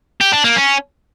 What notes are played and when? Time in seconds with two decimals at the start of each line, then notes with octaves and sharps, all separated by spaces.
0.21 G4
0.32 D4
0.44 A#3
0.56 C#4